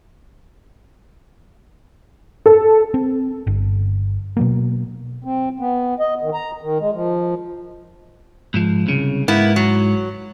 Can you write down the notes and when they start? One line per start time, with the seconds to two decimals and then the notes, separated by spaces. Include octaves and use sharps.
2.46 A4
2.94 C4
3.47 G1
4.37 B2 F#3 A#3
5.24 C4
5.60 B3
5.99 D#5
6.22 D#3
6.34 A#5
6.61 D#3
6.79 G#3
6.93 F3
8.54 G#2 F3
8.87 C2 C#3
9.28 G#2 A#3 B3 E4
9.56 F#3